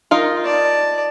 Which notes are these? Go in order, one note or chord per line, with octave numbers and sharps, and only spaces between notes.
D#4 F4 A#4
D5 A5